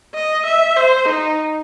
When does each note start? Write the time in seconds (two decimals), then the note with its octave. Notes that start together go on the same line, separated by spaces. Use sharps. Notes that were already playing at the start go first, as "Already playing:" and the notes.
0.15 D#5
0.47 E5
0.77 C5
1.09 D#4